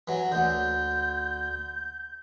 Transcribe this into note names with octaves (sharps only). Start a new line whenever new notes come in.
E3 F#3
D2 D3 G6